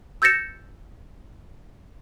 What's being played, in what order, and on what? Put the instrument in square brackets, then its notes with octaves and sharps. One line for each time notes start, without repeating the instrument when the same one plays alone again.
[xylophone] E6 G6 A6 A#6 C#7 E7